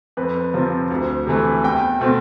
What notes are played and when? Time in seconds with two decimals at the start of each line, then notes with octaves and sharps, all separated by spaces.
0.17 F2 B4
0.54 C3 F3 C4 F4
0.90 D2
1.27 C3 E3 A3
1.63 E2 G5
2.01 B2 A3 C4